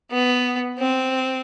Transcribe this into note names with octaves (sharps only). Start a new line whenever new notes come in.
B3
C4